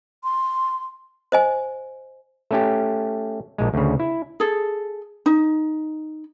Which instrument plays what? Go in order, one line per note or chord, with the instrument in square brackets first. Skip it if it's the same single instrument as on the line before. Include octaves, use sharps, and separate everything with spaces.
[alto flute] C6
[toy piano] C5 D#5 G#5
[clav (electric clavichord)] A3 C#4 G4
A#1 G#3
D2 C#3
E4
[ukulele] G#4 A4
D#4